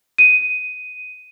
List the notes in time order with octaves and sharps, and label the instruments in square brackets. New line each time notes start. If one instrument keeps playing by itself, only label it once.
[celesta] D#7